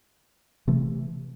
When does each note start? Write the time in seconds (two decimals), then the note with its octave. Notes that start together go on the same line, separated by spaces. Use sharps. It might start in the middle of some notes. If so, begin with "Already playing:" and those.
0.68 C3 E3 A3